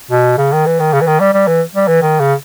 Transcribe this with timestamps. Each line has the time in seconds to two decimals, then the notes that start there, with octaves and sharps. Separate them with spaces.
0.11 B2
0.38 C#3
0.52 D#3
0.66 E3
0.80 D#3
0.93 C#3
1.01 E3
1.07 D#3
1.20 G3
1.33 G3
1.47 E3
1.75 G3
1.88 E3
2.02 D#3
2.19 C#3